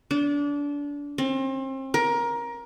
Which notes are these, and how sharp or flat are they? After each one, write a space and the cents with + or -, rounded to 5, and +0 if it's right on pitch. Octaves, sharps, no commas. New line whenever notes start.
D4 -25
C4 +35
A#4 +20